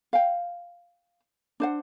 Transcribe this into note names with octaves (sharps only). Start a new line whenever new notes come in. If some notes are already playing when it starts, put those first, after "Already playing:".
F5 G5
D4 C5 F#5